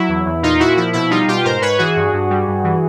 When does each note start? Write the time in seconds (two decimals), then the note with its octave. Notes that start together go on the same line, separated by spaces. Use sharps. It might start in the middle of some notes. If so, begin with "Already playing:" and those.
Already playing: F#3 E4
0.08 E2
0.26 E2
0.43 A#2 D#4 F4
0.60 A#2 E4 F#4
0.77 F3 E4
0.93 B2 E4
1.10 G3 D#4 F4
1.28 B2 F4 G4
1.44 G#2 A#4 C5
1.61 G#2 B4 C#5
1.78 E3 F#4 G#4
1.96 G2
2.13 G2
2.30 G3
2.48 G2
2.64 E3